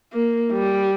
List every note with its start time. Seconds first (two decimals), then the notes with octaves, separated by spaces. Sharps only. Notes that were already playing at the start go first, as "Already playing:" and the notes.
0.13 A#3
0.52 G3